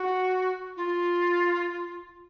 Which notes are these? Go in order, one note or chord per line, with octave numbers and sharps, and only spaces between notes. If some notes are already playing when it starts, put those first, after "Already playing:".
Already playing: F#4
F4